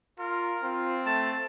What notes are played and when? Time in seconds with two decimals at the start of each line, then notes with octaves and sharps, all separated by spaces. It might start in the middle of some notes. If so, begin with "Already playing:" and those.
0.19 F4 A#4
0.64 C4 F4
1.06 A3 A5